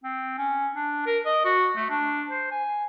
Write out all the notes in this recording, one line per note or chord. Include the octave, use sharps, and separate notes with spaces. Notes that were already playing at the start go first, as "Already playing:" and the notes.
C4
C#4
D4
A#4
D#5
F#4
A3
D4
C5
G#5